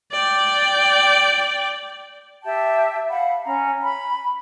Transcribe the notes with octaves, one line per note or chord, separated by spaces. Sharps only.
D5 G5
G4 E5 G5 A5
F5 F#5 B5
C#4 A#5
B5